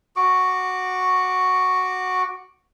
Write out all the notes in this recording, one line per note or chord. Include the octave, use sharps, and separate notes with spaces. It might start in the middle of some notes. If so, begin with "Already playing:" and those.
F#4 C#6 D6